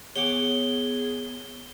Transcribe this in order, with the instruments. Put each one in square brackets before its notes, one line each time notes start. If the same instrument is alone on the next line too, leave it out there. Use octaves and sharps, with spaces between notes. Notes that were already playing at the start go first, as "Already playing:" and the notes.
[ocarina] B3 [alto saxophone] G#4 [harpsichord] C#5 F#5 D6 [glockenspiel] G7